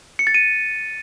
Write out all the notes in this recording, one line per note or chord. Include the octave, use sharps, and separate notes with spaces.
C#7
A6
D#7